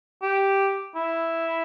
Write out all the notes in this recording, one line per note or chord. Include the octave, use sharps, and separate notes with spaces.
G4
E4